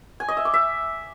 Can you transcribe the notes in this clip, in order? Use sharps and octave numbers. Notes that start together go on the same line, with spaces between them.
G#5
D#5
E5
D6
E5